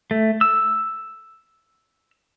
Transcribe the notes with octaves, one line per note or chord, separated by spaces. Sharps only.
A3
E6